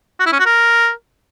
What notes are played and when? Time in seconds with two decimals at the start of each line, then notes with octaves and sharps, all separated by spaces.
0.19 F#4
0.26 E4
0.33 C#4
0.39 F#4
0.46 A#4